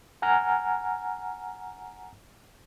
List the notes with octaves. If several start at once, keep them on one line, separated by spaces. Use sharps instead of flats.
F#5 G#5 A#5 F6